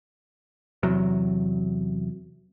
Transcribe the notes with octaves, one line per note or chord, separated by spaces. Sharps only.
E2 C3 F#3